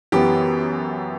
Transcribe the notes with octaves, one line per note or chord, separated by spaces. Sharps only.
F#2 E3 B3 G4